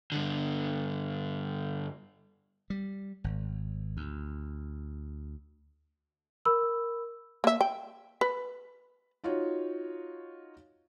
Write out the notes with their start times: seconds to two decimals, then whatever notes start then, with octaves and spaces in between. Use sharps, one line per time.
0.12 G2 D3
2.70 G3
3.24 G#1
3.97 D2
6.45 A#4 B5 E6
7.44 A#3 E5
7.61 G5
8.21 B4
9.24 D#4 F4 F#4 C#5